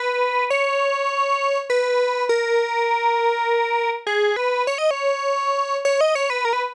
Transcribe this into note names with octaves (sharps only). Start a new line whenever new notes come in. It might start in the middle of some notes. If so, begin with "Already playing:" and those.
Already playing: B4
C#5
B4
A#4
G#4
B4
C#5
D#5
C#5
C#5
D#5
C#5
B4
A#4
B4